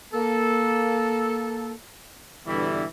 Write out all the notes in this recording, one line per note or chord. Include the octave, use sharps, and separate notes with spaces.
A#3 A4
G2 B2 D3 E3 G3 E4